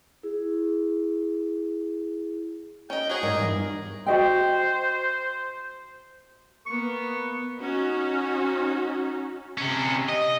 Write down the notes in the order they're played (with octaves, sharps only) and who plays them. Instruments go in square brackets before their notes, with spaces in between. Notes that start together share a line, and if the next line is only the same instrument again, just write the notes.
[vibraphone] E4 G#4
[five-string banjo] C#4 D#5 [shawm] G5
[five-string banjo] F#4 C#5 [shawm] G#4 [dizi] F#5
[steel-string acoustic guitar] G#2 D5 [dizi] A#4 [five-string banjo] D#5
[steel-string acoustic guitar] E2 G2
[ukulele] F#4 D#5 G5 [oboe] C5
[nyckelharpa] A#3 B3 [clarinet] C#6
[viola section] C#4 D#4 F#4
[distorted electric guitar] C3 C#4
D#5